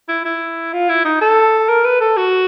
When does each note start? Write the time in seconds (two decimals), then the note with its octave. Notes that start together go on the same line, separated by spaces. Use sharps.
0.09 E4
0.25 E4
0.73 F4
0.89 E4
1.05 D#4
1.21 A4
1.69 A#4
1.84 B4
2.01 A4
2.17 F#4